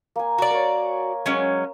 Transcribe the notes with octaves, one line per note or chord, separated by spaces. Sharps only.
A#3 G#5
F#4 D5
A#4 C#5
F#3 G#3 C#4